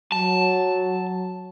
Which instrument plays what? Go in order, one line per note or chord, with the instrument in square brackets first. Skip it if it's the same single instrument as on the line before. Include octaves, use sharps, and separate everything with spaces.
[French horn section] F#3 [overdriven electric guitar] A5